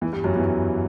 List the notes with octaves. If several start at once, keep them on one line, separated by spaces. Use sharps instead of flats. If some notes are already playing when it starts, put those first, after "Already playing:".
E2 E3
G2 G3
F#2 F#3
E2 E3